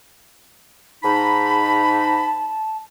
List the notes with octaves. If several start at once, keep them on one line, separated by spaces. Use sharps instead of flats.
G#2 D#4 A5 B5